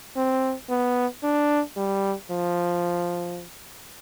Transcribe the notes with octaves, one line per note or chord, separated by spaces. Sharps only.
C4
B3
D4
G3
F3